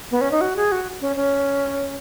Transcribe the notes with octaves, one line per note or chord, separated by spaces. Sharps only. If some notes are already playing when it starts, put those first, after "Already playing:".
B3
C#4
D#4
F#4
G#4
F#4
C#4
C#4